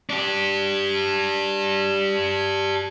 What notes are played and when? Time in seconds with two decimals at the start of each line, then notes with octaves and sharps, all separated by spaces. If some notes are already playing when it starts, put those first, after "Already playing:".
0.10 D4 G4